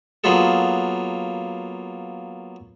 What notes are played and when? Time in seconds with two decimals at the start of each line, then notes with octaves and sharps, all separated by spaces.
0.24 F#3 A#3 B3 F4 G#4 A4